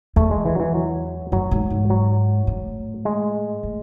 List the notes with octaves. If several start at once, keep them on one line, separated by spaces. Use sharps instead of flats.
E2 A3
G#3
E3
F#3
E3
F#3
F#2 F#3
G#2
G#2
F#3
A2
G#3
A2